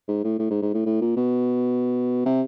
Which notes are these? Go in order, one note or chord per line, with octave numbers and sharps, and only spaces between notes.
G#2
A2
A2
G#2
G#2
A2
A2
A#2
B2
C3